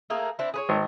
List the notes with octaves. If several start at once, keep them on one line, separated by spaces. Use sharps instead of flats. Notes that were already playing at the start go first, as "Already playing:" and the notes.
A3 A#3 G#4
C4 D4 E4
G#4 B4 C#5
G#1